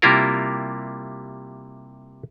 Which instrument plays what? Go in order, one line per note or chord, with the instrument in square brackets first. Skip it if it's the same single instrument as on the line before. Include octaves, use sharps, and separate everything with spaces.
[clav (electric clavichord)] C3 G3 A#3 E4 F4 A#4